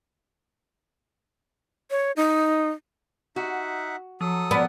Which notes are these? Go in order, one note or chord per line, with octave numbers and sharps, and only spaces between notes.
C#5
D#4
D#4 F#4 E5 F#5
F3 F#3 A4 D#6
A#2 B3 D5